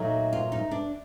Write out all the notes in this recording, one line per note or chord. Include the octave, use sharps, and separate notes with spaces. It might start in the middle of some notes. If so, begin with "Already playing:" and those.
Already playing: A#2 F#3 A3 D#4
F4
D#4
D4